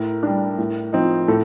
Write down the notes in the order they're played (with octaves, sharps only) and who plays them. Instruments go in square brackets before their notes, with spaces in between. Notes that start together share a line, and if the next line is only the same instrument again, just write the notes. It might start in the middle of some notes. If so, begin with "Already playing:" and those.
Already playing: [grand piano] A2 A#4
G3 D4
A2
F3 C4 D#4
A2 A4